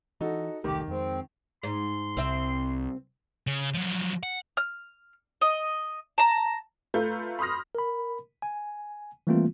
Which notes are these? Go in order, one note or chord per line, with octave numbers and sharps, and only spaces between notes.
E3 D#4 F#4 A4
E1 C2 D#3 A3 G4
F2 G#3 C4
G#2 C6
C2 C4 E5
C#3
F3 F#3
F#5
F6
D#5
A5 A#5
A3 F4 B4 A#5 G6
B5 C6 D#6 F6 A#6
A#4 B5
G#5
E3 G3 A3 A#3 C4 F4